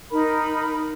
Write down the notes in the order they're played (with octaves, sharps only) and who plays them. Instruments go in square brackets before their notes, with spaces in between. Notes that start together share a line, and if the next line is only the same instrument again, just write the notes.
[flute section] D#4 A#4 B5